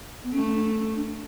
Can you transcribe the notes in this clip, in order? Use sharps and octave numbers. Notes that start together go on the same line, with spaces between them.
B3
A3 C#4
D4
D4